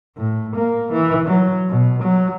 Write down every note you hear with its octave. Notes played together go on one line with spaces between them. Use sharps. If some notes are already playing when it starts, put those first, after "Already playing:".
A2
A#3
E3
F#3
B2
F#3